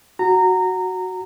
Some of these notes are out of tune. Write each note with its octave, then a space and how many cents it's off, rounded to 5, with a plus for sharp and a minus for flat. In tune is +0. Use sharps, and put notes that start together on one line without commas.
F#4 +0 A#5 -20